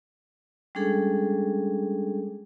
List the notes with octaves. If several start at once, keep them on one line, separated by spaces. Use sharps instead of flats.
G3 G#3 C#4 D4 G#4 A4